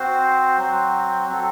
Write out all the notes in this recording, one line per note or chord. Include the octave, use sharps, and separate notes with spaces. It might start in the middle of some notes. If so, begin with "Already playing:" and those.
Already playing: C4 F#4 C5
F#3 C4 F#4
F#3 C4 F#4 A4